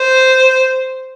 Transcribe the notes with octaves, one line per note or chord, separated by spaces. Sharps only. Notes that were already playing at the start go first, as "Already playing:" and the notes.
Already playing: C5